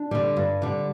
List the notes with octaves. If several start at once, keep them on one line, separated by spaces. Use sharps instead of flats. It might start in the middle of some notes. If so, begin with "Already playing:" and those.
Already playing: D4
D3 G3
G2
D3 G3